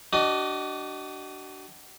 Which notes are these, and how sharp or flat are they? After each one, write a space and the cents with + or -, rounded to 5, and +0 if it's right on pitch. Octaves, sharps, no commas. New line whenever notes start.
D4 +0 F#4 +40 D#5 +0